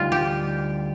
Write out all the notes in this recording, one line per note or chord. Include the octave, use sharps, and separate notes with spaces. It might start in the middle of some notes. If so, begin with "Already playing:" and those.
Already playing: D2 D3 G3 D#4 F4
G4